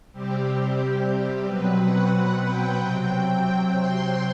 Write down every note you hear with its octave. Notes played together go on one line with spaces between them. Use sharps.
C3 G3 C4 G4
B2 F#3 C4 B4
F#5
F#5
G5
C3 F#3 C4
G5
C6